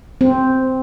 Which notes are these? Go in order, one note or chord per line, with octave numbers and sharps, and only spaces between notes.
C4